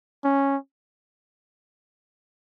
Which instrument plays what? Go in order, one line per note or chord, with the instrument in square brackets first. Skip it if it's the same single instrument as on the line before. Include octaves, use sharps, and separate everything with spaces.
[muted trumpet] C#4